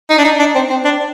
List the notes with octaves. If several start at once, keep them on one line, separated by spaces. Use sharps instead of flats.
D#4
D4
D#4
D4
C4
C4
D4